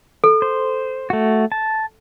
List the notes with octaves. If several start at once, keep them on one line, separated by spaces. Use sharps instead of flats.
A4
C5
A3 F#4
A5